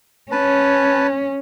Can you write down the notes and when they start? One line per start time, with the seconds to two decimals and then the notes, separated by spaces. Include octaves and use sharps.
0.32 C#4 B4 A5